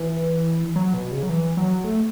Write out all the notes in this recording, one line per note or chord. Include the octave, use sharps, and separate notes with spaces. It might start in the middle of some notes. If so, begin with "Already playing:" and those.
Already playing: E3
F#3
B2
C#3
F#3
E3
F#3
A3